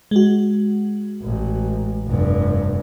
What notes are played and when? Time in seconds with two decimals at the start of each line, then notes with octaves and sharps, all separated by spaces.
0.11 G#3 F#4
1.23 A1
2.08 F1 G2